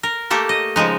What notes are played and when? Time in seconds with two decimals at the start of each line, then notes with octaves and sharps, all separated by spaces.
0.03 A#4
0.30 A3 A#3 G4 A4
0.49 D#5
0.76 C#3 F3 G#3 D#4